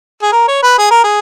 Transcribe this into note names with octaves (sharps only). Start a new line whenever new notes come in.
G#4
A#4
C#5
B4
G#4
A#4
G#4